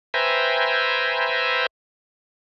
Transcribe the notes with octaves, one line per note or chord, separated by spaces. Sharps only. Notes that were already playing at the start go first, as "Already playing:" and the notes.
B4 C5 E5 G5 G#5 A#5